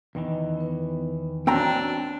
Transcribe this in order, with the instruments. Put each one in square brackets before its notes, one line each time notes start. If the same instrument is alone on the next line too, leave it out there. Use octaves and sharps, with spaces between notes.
[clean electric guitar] E2 D#3 E3 [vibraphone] B4 D#5
[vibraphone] B3 D#4 B4
[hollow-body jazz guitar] C4 G5 A#5 [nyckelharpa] D4 [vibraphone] F#4 C#5